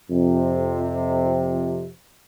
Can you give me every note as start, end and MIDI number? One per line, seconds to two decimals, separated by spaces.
0.11 1.88 41
0.11 1.88 48